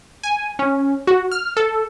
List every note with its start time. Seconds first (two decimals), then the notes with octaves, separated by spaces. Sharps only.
0.23 G#5
0.59 C#4
1.07 F#4
1.31 F6
1.57 A4